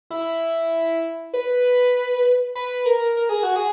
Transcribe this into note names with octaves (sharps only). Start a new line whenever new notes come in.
E4
B4
B4
A#4
A#4
G#4
F#4
G#4